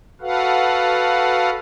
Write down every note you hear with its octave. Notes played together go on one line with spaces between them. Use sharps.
F#4 A4 B4 F5 F#5